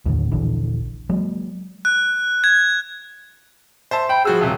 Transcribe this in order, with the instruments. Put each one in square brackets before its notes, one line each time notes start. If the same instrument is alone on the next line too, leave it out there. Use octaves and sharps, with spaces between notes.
[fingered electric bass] D#2 A2 D3
D#1 A#1 D3 E3
F#3 G#3 A#3
[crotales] F#6
G#6
[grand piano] C5 E5 A5
[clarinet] G5 [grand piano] B5
[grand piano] F3 F#4 E6 [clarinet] G#4
[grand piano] D#1 C3